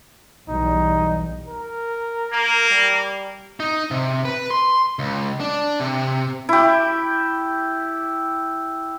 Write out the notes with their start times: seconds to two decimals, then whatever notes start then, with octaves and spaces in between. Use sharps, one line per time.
0.49 B1 E2 G3 D#4
1.49 A#4
2.33 A#3
2.69 G3
3.60 D#4
3.91 C3
4.25 B4
4.50 C6
4.99 C#2
5.40 D4
5.80 C3
6.49 E4 G4